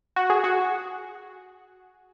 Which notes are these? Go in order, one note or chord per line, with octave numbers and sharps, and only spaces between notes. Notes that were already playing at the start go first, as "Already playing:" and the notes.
F#4
G#4
F#4